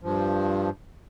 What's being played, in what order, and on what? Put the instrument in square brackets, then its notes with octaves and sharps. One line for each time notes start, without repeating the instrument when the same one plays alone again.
[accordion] G2 F3